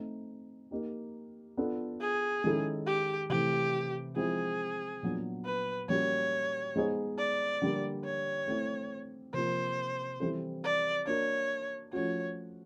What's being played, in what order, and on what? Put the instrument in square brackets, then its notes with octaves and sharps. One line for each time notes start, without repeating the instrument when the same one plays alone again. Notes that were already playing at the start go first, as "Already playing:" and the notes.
Already playing: [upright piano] A3 C4 D#4
A#3 D#4 G4
B3 D4 F4 A4
[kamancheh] G#4
[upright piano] D#3 G#3 C#4 E4 A4
[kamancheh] G4
[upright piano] C3 E3 A3 [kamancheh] G4
[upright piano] F3 G#3 C4 E4 [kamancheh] G#4
[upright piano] A#2 F#3 B3 D4
[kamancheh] B4
[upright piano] A#2 G3 A#3 C#4 F#4 [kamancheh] C#5
[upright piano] G#3 B3 D#4 G#4 C5
[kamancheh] D5
[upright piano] D3 G3 A#3
[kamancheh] C#5
[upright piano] A3 C4 E4
[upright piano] C3 F3 A#3 [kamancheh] C5
[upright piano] E3 G3 C4 E4 A4
[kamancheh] D5
[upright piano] A#3 D4 F#4 A#4 [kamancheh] C#5
[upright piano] F3 A3 C#4 F#4 [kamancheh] C#5